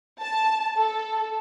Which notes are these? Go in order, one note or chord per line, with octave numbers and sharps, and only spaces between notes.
A5
A4